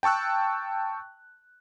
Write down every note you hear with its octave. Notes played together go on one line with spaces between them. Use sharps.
G5 A5 C#6 E6 F#6